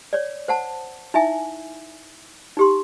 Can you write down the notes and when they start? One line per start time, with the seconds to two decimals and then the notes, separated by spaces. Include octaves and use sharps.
0.13 C#5 D5
0.48 C5 F#5 A5
1.14 D#4 E4 E5 G#5
2.57 D#4 G4 C6